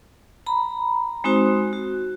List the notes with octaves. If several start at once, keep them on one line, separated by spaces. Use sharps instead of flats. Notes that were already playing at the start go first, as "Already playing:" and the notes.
A#5 B5
G#3 C4 D#4 F#4 C5
F#4